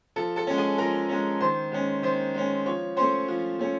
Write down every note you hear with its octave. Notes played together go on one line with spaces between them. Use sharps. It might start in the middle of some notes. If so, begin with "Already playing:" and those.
F3 A4 A5
A4 A5
G#3 C#4
G#4 G#5
F3 A#4 A#5
G#3 C#4
D#3 C5 C6
G#3 C#4
D#3 C5 C6
G#3 C#4
F3 C#5 C#6
A3 C#4 C5 C6
F3
A3 C#4